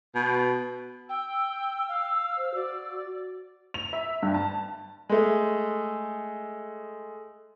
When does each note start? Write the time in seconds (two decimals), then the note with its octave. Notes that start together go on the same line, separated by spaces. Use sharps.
0.15 B2
1.09 G5 E6
1.88 F5
2.38 C5
2.55 F#4 D5
3.74 F7
3.93 E5
4.23 G2
4.34 A5
5.09 G#3 A3